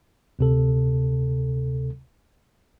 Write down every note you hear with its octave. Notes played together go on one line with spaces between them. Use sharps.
D2 C3 A4